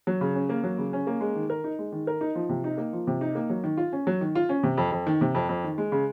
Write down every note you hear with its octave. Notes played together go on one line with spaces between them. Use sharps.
F#3
C#3
C#4
A#3
F#3
C#3
C#4
A#3
G#3
D#3
A#4
D#4
G#3
D#3
A#4
D#4
F3
C3
D#4
A#3
F3
C3
D#4
A#3
F#3
D#3
F4
C#4
F#3
D#3
F4
C#4
C3
F2
F2
D#3
C3
F2
F2
D#3
G#3
C#3